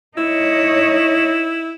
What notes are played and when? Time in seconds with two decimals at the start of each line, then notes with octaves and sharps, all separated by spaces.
0.17 D#4 E4 C#5